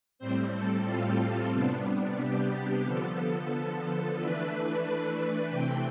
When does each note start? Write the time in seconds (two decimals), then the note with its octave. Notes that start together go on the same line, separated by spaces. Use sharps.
0.19 A2 G3 C4 C5
0.53 A4
0.85 F4
1.52 C3 G3 B3 D4
2.18 G4
2.85 D3 F3 B3 A4
4.18 E3 A3 D4 B4
5.50 C3 E3 A3 C4 G5